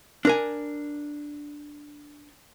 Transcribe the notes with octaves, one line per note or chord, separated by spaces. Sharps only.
D4 A#4 G#5